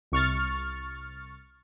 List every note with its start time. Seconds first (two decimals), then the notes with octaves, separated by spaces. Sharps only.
0.12 C2 C#6 F6 A6